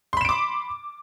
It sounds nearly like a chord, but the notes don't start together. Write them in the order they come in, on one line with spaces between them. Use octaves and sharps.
C6 B5 E7 D7 D6